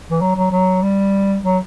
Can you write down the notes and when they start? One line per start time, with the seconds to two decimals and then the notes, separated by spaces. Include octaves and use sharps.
0.10 E3
0.21 F#3
0.36 F#3
0.51 F#3
0.82 G3
1.44 F#3